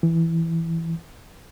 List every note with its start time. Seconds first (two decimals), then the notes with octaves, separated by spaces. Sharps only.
0.03 E3